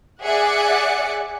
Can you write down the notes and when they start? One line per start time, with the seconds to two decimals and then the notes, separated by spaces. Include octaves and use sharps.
0.24 G#4 D5 E5 F#5 F#6 C#7